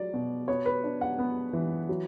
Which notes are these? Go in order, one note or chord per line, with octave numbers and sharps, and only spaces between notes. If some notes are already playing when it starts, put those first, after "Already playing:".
Already playing: F#3 D5
B2
B3 C#5
B4
D4
F#5
B3
E3
F#3